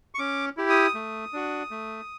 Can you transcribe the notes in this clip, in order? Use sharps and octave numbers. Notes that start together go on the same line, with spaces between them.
C#6
C#4 D6
E4 G4
D#6
A3
D4 F#4
A3